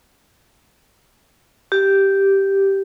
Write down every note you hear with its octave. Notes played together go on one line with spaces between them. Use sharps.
G4